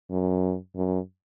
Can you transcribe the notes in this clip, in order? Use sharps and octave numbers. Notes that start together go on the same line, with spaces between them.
F#2
F#2